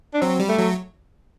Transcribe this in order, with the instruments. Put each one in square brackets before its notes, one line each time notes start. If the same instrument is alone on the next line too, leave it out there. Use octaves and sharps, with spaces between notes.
[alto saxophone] D4
[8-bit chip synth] F#3 [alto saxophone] C4
[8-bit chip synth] G3
[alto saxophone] A3
[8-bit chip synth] F#3